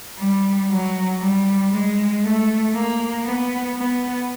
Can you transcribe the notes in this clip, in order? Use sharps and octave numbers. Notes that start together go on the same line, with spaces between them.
G3
F#3
G3
G#3
A3
A#3
B3
B3